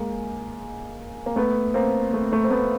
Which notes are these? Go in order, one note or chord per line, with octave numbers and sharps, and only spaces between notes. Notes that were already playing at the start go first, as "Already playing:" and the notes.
Already playing: G#3 A#3
A#3
A3 B3
A#3 C4
A3
A3
C4
A3 B3